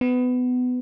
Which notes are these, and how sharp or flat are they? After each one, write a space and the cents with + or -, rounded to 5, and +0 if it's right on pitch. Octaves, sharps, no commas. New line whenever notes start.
B3 +20